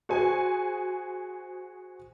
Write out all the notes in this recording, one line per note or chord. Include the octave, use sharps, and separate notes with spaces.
F#4 G#4 C5 G#5